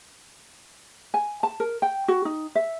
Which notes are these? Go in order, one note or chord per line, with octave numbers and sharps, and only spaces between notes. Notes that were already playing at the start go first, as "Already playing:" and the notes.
G#5
A5
A#4
G5
F#4
D#4
E5